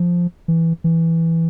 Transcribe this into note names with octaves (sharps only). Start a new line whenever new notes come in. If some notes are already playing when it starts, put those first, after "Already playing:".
Already playing: F3
E3
E3